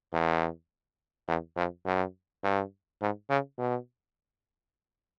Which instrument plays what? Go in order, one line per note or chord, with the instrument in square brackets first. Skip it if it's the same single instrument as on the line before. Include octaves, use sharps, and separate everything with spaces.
[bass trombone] E2
E2
F2
F#2
G2
G#2
C#3
B2